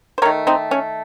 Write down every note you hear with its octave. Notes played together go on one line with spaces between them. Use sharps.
C5
D#3 A3 A#4 C#5
C4 D#4
C#4